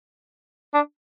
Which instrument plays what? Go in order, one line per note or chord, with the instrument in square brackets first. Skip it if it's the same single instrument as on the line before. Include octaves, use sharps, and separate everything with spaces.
[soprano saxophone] D4